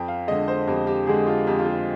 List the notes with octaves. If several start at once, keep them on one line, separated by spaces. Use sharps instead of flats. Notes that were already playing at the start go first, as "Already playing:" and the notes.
Already playing: F2 G5
F5
D3 G#3 D#5
C5
F2 G4
G4
D3 G#3 G#4
F4
F2 G4
F4
G4